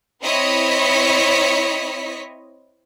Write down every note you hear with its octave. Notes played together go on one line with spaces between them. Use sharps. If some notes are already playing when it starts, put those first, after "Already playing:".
C4 E4 C#5 D#5 B6 C#7